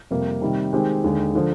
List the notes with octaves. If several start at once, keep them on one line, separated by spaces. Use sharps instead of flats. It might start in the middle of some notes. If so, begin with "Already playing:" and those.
F2 C3 G3 A#3
C3 D#3 G3
D#3 G#3 C4 G4
D#2 D3 G#3
D3 F3